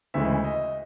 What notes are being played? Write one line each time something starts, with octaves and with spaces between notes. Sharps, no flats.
D2 C#3 E3 G#3 E5
D#5